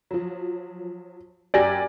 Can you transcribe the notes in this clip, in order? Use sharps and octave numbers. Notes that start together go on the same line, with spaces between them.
F3 F#3
F#2 G4 D5 G#5 D6 A#6